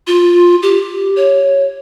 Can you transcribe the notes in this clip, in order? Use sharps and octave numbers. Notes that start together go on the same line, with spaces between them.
F4
G4
C#5